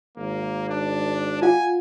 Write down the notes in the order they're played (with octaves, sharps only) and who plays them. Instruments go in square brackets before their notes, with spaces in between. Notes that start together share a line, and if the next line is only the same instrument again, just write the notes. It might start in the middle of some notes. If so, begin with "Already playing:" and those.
[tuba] G#1 [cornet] A#3
[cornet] D4
[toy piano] F4 F5 F#5 [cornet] G#5